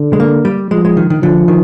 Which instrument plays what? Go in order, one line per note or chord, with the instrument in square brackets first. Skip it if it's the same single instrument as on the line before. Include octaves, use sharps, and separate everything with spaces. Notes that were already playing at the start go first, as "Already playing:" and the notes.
Already playing: [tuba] D3
[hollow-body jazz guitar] G#3
A#3
G3
[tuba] F3 [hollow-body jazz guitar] G#3
[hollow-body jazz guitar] G#3
D#3
D#3
[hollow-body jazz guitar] D3 [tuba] F3
[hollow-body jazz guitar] D#3